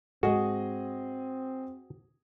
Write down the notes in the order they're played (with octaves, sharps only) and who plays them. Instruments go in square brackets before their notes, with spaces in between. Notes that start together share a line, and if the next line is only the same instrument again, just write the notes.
[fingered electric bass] G#2 G#3 [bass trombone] C4 [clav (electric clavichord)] F#4 [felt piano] G#4 D#5